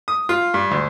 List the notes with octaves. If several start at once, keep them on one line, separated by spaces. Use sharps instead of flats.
D#6
F4
G2
D2